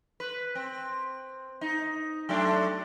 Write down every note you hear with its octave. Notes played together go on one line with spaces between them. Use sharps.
B4
C4
D#4
F#3 A3 D4